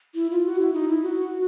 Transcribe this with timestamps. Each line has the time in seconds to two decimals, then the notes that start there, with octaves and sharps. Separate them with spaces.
0.15 E4
0.31 F4
0.45 F#4
0.59 E4
0.74 D#4
0.89 E4
1.03 F#4